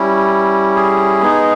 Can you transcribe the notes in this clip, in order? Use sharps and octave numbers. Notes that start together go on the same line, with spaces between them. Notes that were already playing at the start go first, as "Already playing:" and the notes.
Already playing: G3 C#4 E4
G#4
G#3 B3 D#4